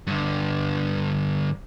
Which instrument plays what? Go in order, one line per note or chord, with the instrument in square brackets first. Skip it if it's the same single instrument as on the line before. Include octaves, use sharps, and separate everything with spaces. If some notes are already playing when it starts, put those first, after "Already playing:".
[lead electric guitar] G2 D3